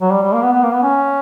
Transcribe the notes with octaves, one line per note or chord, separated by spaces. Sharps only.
F#3
G3
G3
A#3
B3
B3
A#3
B3
C#4